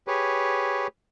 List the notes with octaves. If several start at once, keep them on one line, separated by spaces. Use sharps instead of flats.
G4 G#4 B4 C#5